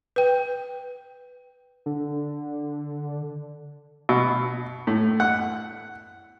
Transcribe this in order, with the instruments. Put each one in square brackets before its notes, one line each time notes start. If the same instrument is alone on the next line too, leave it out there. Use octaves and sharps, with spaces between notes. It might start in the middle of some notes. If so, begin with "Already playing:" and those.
[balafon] B4 G5
[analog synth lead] D3
[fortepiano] B2
A2
F#5